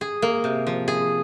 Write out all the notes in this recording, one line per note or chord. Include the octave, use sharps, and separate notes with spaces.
G#4
A#3
C3
F3
G#4